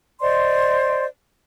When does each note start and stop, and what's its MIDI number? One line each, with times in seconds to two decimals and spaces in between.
0.21 1.05 72
0.21 1.05 74
0.21 1.05 75
0.21 1.05 84